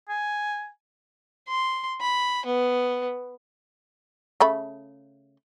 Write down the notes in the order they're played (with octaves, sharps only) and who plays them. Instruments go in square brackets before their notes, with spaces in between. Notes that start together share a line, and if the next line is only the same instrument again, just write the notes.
[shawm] G#5
[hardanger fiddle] C6
B5
B3
[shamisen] C#3 A3 B5